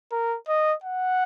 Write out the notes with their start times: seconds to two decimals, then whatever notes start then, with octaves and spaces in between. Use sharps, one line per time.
0.12 A#4
0.48 D#5
0.83 F#5